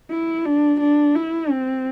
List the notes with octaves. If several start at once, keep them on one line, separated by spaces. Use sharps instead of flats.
E4
D4
D4
E4
C4